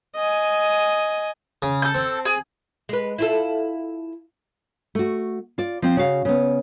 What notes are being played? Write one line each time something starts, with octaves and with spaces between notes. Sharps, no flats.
D#5 G#5
C#3
A4 G6
C4
G#4
G#3 B4
E4 F4 A4
A3 F#4
F4 D5
F3 C4
C#3 F#4 F5
C#3 B3